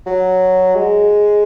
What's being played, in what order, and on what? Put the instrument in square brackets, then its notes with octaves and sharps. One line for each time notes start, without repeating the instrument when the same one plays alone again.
[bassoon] F#3
G#3